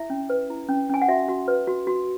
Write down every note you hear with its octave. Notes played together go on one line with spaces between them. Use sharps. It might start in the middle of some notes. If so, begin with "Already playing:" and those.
Already playing: E4 E5
C#4
B4
E4
C#4
C#4 G#5
F#5
F#4 E5
F#4
B4
F#4
F#4